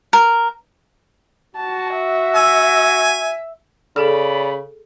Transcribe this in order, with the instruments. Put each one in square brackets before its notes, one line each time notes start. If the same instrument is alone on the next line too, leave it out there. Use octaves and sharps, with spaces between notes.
[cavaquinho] A#4
[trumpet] F#4 [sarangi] A5
[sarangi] E5
[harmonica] G#5 [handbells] E6
[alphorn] C#3 [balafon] G#4 A4 [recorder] D5 [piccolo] B5